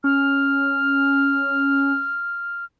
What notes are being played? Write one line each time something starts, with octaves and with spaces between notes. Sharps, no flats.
C#4 F6